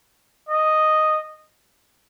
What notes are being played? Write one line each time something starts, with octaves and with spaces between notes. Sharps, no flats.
D#5